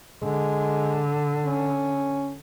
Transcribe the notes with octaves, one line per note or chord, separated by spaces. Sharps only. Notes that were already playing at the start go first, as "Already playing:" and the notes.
D3 G#3
C#4